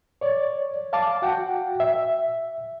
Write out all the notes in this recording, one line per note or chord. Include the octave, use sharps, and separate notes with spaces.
C#5 D5
F5 A5 D6
F#4 F#5 G5
E5